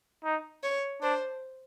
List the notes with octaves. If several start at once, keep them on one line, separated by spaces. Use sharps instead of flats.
D#4
C#5
D4 C5